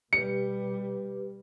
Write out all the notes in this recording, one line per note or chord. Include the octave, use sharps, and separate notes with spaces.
B2 G3 G4 B4 C#7